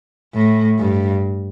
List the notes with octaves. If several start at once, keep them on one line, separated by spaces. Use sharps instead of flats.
A2
G2